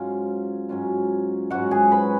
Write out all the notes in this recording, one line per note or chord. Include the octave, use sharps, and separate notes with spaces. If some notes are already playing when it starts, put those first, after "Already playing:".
Already playing: G#2 F#3 C#4 F4 F5
G#2 F#3 C#4 F4
G#2 F#3 C#4 F4 F#4 F#5
G#4 G#5
B4 B5